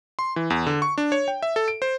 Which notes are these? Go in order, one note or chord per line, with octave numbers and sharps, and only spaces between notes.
C6
E3
E2
D3
C#6
D4
C#5
G5
E5
A4
D7
C5